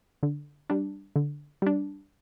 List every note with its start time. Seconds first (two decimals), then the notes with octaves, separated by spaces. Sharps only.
0.23 D3
0.70 G3 D4
1.16 D3
1.62 G3 D4